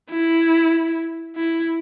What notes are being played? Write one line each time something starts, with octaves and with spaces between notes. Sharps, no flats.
E4
E4